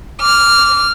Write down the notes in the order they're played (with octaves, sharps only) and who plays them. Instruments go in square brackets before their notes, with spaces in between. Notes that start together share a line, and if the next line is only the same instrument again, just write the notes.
[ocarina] D6 [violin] F6